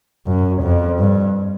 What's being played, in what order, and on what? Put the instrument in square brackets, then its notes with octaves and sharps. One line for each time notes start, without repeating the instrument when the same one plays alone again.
[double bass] F#2
F2
G2